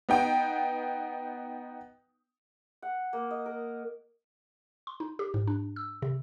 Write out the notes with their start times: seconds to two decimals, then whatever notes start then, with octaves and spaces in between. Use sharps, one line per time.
0.09 B3 D#4 G5
2.82 F#5
3.13 A#3
3.31 D#5
3.46 A#4
4.87 C6
5.00 D#4
5.19 G4
5.34 G#2
5.47 D4
5.76 E6
6.02 C3